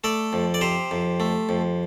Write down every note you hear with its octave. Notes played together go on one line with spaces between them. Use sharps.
A3 A4 D5
F2
D5
C3 G4 C5
F2
A3
F2